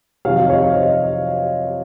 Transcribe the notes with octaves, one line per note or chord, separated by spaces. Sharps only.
F2 C3 D#3 F#3 C#5 F5
D#5
C#5 F5
C5 D#5